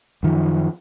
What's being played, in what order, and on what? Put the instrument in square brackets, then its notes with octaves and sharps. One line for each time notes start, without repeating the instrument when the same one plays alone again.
[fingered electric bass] F#2 D#3 F3